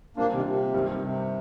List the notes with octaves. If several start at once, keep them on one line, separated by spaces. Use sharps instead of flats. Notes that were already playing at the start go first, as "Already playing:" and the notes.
A#2 G3 A#3 C4 D4 F4
C3 D#3
C3
G2 D#3 G3 C4
C3